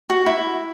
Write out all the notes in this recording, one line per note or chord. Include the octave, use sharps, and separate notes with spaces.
F#4
E4